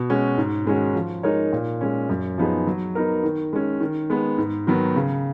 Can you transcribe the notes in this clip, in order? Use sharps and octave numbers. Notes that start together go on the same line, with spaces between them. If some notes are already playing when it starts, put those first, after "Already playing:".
Already playing: B2
G#3 C#4 F#4
G#2
D#3 G#3 C#4 F#4
F3
G#3 D#4 A#4 C#5
A#2
G#3 C#4
F#2
F3 B3 D#4 G#4
F#3
B3 D#4 A#4
D#3
G#3 C#4
D#3
G#3 B3
G#2
D#3 F#3 B3
C#3